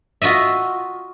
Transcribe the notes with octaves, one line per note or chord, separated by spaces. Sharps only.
F4 F#4 D#5 E5